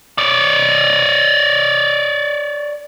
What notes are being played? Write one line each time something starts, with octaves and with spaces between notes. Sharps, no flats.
C#5 D5